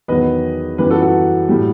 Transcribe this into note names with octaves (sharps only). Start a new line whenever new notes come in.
E2 D#3 F#3 B4 D#5
F#2 E3 G3 G4 B4
F#4 A4
F#4 A4
A2 G3